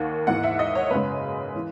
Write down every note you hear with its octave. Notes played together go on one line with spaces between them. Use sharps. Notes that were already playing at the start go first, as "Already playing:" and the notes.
Already playing: D#2 D#3 A#3 F#5
G#2 E3 A#3 F#5
E5
D#5
C#5
F#2 C#3 G#3 B4
E3